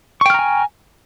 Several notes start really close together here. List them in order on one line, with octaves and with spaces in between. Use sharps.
C#6 G5 F6 A#5 G#5